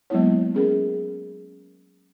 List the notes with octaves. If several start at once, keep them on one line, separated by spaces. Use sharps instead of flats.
F#3 G#3 A#3 B3 E4 C#5
C#4 G#4 A#4